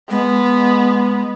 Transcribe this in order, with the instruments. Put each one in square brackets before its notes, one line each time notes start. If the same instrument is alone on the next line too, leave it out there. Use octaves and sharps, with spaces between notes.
[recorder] G#3 [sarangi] B3